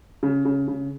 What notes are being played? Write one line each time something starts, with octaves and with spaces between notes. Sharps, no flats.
C#3
C#3
C#3